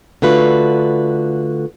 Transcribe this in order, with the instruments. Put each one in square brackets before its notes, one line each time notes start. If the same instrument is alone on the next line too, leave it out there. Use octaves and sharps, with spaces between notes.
[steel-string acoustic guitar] D3 A3 F4 F#4 B4